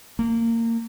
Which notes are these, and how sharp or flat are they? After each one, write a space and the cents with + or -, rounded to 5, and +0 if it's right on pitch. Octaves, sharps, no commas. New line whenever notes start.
A#3 -25